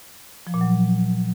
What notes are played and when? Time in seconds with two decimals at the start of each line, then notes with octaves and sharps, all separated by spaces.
0.47 F3
0.54 A#2
0.61 F#3